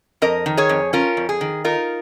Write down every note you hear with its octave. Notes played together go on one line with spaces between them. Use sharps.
F2 A#4 D#5
D#3
G#4 C#5
F2
C#4 F4 A#4
F2
G#4
D#3
D#4 F4 A#4